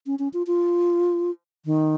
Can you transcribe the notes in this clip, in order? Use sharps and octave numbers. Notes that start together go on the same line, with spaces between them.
C#4
C#4
F4
F4
D#3